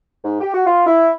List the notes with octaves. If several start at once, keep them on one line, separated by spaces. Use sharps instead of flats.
G#2
G4
F#4
F4
E4